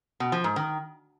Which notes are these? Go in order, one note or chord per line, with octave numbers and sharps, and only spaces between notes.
B2
F3
G#2
D#3